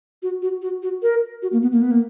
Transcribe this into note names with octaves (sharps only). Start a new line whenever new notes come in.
F#4
F#4
F#4
F#4
A#4
F#4
A#3
B3
A#3
B3
A#3